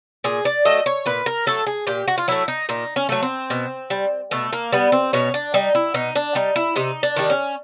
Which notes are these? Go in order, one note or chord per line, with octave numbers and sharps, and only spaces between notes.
A#2 G#4
D5
F#3 A3 D#5
C#5
A#2 B4
A#4
F#3 A3 A4
G#4
A#2 G4
F#4
F4
F#3 A3 E4
D#4
A#2 D#4
C#4
F#3 A3
C4
B2
G3
B2 A3
A#3
G3 B3
C4
B2 C#4
D4
G3 D#4
E4
B2 D#4
D4
G3 D#4
E4
C3 D#4
D4
D#3 G3
C#4